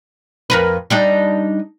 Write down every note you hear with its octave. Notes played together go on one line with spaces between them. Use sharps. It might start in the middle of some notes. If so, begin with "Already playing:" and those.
F2 A#4 B4
G3 D4 D#4